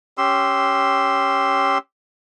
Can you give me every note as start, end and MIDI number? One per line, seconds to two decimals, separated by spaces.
0.18 1.78 61
0.18 1.78 67
0.18 1.78 84
0.18 1.78 88